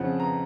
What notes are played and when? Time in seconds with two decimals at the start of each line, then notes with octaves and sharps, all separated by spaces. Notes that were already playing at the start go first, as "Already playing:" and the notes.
Already playing: F2 C#3 F3 F#5
0.20 A#5